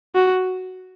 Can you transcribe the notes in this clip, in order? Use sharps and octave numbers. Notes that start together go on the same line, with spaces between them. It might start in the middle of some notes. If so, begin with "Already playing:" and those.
F#4